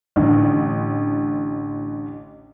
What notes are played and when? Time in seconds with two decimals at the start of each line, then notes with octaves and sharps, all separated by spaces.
0.16 A1 D3